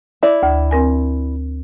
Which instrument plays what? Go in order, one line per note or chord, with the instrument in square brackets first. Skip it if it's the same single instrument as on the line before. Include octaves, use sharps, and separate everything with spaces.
[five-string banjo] E4 D5
[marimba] D2
C4 A#4 G#5